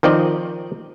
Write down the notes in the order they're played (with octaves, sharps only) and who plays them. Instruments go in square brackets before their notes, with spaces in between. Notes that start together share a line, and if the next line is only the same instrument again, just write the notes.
[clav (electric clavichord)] D#3 F3 C4 D5 D#5